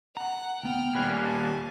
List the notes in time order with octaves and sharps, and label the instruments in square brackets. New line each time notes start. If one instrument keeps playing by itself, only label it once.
[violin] F#5 [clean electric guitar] A#5
[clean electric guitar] D2 B3 F#5 [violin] G5 F6
[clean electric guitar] D#2 C#5 B5 [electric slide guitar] A#2 G3 [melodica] B4 F5 G#5
[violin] G#5 [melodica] A5